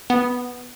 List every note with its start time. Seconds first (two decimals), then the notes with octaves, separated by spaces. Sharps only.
0.10 B3